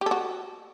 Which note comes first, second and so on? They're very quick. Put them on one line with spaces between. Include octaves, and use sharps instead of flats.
G4 A4 F#4